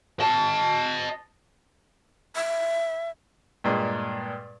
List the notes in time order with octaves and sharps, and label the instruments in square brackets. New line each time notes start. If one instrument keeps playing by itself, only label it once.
[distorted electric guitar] D#5 A5
[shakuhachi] E5
[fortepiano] G2 A#2 G#3